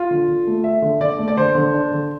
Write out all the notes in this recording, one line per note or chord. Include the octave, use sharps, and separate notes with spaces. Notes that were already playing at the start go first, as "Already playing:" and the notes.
Already playing: F4
D3
D3
A3
A3 E5
D3
D3 D5
A3
D5
D3 C5
D3
D4
D3